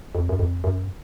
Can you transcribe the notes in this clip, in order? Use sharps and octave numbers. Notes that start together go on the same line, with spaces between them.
F2
F#2
F2
F#2